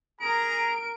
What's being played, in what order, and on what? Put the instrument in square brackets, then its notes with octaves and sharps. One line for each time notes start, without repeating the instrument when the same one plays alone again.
[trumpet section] G#4 A#5 [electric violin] A#4 D7